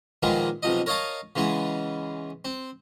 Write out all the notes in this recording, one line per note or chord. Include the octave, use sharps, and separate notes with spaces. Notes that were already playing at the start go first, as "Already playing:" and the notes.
A#2 D#3 F3 G#3 A#3 B3
B1 C3 F3 D#5
A#4 C#5 D#5 F5 A5
C#3 E3 G#3 B3
C4